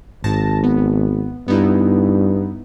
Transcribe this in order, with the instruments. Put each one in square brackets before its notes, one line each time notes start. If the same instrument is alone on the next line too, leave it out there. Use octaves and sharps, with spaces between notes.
[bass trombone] G#1 [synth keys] G#2 A5 A#6
[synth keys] B3
[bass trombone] G2 [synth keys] B3 D#4 E4